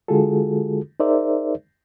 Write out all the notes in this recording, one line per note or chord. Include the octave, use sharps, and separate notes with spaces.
D3 G#3 F4 F#4 G#4 A4
D#4 G#4 A#4 C5 D5 E5